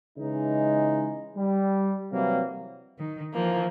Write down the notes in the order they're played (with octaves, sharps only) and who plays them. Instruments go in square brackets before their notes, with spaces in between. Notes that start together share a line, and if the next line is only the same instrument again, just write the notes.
[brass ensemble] C#3 E3 G#3 D#4
G3
C3 E3 F#3 G3 A#3
[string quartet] D#3
E3 F3 A#3